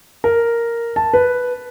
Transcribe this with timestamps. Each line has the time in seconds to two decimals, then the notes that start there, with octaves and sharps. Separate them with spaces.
0.24 A#4
0.96 A5
1.14 B4